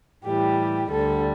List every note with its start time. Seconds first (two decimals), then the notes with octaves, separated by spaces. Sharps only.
0.24 A2 E3 G3 G4
0.90 D2 D3 G3 A4